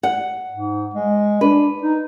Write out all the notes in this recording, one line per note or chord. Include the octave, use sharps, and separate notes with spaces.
F#5
G#2
G#3
D4 B4
D#4